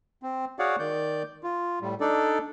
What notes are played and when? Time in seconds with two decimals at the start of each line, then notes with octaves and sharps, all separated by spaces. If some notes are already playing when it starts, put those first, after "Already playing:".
0.23 C4
0.59 F#4 G#4 C#5 D5 F5 F#5
0.79 D#3 D5 G6
1.43 F4
1.82 A2 G3
2.01 D4 D#4 A4 D5